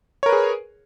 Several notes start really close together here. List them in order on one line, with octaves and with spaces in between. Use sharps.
C#5 A#4 B4 G#4